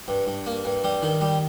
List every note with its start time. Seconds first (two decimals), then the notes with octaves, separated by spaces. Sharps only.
0.08 G2
0.27 G2
0.46 A#3
0.65 G2
0.84 G3
1.02 D#3
1.21 G3